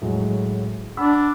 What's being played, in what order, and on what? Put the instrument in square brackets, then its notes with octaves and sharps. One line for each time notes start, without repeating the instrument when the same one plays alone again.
[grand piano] A2 F#3 G#3
[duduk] D4 [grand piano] F#5 B5 E6